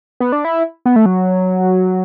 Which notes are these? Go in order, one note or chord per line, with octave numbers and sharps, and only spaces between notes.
B3
D4
E4
B3
A3
F#3